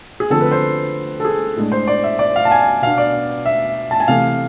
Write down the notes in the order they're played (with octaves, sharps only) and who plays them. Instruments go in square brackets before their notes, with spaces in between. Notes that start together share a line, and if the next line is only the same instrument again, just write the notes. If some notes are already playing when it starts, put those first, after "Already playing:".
[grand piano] G#4
D3 F3 A3 C4 A4
B4
C5
A4
G#4
A2 G#3 D4
C5
D5
E5
D5
F5
A5
G#5
B2 B3 D4 F5
D5
E5
A5
G#5
C3 E3 A3 F5